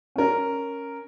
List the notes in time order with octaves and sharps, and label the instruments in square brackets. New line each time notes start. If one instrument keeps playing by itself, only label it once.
[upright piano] C#4 A#4